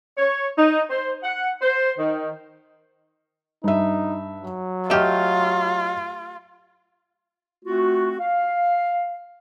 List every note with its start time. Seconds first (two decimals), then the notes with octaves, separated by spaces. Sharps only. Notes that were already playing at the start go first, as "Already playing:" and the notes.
0.17 C#5
0.58 D#4
0.90 C5
1.23 F#5
1.62 C5
1.99 D#3
3.64 G2 D#4 E5
4.42 F#3
4.90 A3 F4 G4 D#5 F6
7.65 A3 C4 F4 F#4
8.20 F5